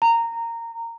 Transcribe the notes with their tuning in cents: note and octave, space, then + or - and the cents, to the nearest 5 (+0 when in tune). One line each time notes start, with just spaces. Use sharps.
A#5 -15